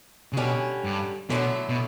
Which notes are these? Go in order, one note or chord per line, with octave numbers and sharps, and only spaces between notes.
C#3
B2 D3 G3 C#4
G2
B2 D3 F#3 A3 E4
B2